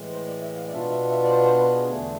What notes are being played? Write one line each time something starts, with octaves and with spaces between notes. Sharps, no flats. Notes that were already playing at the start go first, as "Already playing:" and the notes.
Already playing: A2 E3 G#3
C5
D5
E5
F5
D5
B2 B3 D4 F4 E5
E5
E5
D5
C5
C5
B4
G#4
E2 D3 A3 D4